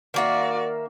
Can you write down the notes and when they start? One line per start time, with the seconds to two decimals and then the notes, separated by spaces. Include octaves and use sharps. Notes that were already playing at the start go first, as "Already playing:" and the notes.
0.14 D#3 A#3 F#4 D5 E5